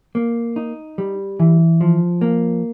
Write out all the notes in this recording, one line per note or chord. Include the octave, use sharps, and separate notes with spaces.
A#3
D#4
G3
E3
F3
A#3